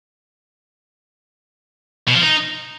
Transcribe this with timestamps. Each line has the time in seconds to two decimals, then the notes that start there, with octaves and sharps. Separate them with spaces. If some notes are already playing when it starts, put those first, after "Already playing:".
2.08 B2
2.15 F3
2.22 D#4